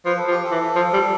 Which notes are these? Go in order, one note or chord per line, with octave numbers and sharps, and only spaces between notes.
F3 B4
A4
F3
G4
A4
E3
F3
G3